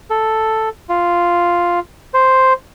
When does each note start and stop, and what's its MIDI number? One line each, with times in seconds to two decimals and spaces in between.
0.10 0.69 69
0.89 1.79 65
2.14 2.53 72